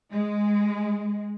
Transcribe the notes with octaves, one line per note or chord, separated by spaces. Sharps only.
G#3